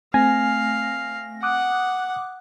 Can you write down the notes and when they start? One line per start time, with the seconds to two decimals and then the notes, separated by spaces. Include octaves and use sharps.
0.14 A3 C4 F5 G#5 A#6
1.43 F#5 D6 D#6 F#6